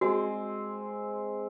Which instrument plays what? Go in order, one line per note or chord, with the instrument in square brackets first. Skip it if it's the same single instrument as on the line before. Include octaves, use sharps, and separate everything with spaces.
[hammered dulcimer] G#3 C4 [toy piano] F#4